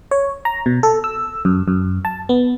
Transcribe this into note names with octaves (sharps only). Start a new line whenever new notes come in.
C#5
A#5
B2
A4
E6
F#2
F#2
A5
B3